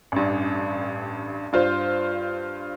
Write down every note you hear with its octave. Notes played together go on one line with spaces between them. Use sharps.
A1 G2
G2 F4 C5